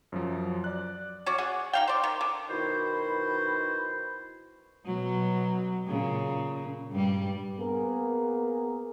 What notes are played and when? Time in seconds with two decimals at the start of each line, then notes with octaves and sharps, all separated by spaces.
0.12 F#2 F3 F#3
0.64 D5 F#6
1.26 C#4 F#4 D5
1.38 G#4 F#5
1.73 D#4 F5 G5
1.88 C5 D5
2.04 D#3
2.21 D3
2.50 B2 D#3 E4 F#4 C5 B5
4.86 B2 F#3
5.87 A#2 C#3
6.91 G2 G3
7.58 A#3 B3 G#4 A#4